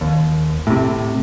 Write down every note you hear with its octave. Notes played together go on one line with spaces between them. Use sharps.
D#2
A2 C3